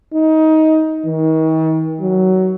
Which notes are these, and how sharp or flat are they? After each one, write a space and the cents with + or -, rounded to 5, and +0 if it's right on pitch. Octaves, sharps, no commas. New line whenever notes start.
D#4 +20
D#3 +40
F#3 +15